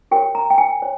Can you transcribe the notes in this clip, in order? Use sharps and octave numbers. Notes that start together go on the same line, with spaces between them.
G4 A#4 C#5 G5
A#5
G5
G#5
C#5